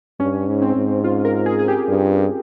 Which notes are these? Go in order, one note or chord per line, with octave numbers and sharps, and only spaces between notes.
G2 C#4
G#2
C4
G#2
F4
A#4
G#4
G#4
G4
G2